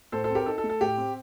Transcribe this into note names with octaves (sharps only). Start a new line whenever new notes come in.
A2 A4 C5
A4 C5
C4
G4 A#4
D#4 A4
A4
A3
A4
A2 G4
C4